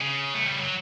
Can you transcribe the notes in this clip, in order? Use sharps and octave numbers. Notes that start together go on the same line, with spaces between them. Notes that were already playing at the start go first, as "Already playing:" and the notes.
C#3
A3
G3
F#3